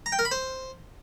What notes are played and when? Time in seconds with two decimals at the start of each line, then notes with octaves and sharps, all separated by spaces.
0.06 A#5
0.12 G5
0.19 A#4
0.25 B5
0.31 C5